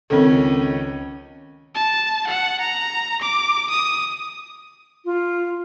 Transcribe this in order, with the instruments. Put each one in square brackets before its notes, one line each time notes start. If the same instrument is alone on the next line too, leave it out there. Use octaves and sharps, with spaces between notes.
[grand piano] C#2 D#3 F3 [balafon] C4 A4 [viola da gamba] C#4
[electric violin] A5
F#5
A#5
D6
D#6
[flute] F4